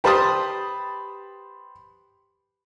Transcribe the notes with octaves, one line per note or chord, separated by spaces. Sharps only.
G4 B4 C5 A5 B5 D#6